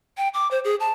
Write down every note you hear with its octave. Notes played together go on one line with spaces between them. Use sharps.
G5
D6
C5
G#4
A5